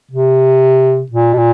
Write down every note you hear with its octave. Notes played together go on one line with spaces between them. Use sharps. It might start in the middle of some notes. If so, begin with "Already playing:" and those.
C3
A#2
B2
A#2